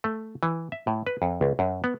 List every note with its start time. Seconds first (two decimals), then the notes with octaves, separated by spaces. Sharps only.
0.04 A3
0.43 E3
0.72 E5
0.87 A2
1.07 B4
1.22 F2
1.41 C#2
1.59 F#2
1.84 B3